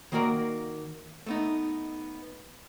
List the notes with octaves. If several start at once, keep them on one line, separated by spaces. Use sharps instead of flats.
D#3 A#3 F#4 A#4 D5
A3 B3 D#4